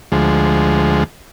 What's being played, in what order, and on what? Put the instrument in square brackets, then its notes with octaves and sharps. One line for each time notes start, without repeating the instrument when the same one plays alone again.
[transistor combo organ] D2 F3 G#3